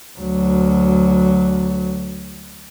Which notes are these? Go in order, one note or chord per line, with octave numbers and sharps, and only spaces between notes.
D2 F#3